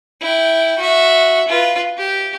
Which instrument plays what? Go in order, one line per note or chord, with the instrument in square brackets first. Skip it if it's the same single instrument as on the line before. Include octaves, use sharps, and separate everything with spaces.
[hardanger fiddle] E4 G5
F#4 E5
F4 B4
G4